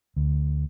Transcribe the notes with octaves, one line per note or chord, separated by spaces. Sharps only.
D2